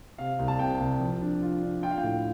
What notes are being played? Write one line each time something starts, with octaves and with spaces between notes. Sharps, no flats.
C3 F5
C2
A5
C3 G5
C2
F3
D4
F4
D4
F4 G5
F5
G5
A2